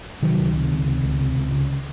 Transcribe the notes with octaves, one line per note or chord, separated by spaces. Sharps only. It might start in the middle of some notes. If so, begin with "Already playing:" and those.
C3 D#3 F#3
C#2
C3
C#2
C3
C#2
C3
C#2
C#3